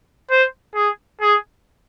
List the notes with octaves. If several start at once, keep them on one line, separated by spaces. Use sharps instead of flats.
C5
G#4
G#4